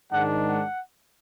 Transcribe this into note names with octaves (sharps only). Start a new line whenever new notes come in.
G#2 D#3 G#3 D4 F#5
F#5